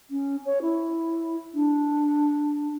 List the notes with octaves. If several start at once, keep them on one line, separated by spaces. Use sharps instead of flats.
C#4
C#5
E4
D4